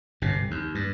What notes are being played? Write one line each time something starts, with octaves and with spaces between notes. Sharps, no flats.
G1 C3
D#2
G2